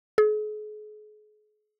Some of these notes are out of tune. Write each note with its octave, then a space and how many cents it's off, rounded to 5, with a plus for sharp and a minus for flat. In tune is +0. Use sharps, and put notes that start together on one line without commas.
G#4 +40